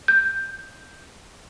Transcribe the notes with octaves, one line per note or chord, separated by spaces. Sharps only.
G6